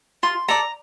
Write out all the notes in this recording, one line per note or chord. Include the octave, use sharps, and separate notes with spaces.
F4 C6
A4 D5 A#5